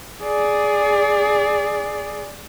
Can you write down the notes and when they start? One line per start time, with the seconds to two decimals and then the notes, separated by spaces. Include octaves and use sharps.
0.23 G#4 D5